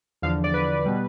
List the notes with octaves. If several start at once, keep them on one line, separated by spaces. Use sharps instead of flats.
E2 D3 F3 F5
D5
B4
B2 G3